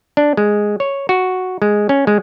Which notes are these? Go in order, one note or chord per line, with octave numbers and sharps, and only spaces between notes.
D4
G#3
C#5
F#4
G#3
C#4
G#3